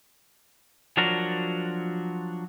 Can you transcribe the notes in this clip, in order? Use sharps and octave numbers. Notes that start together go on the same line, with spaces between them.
F3 F#3 D4 F#4 A#4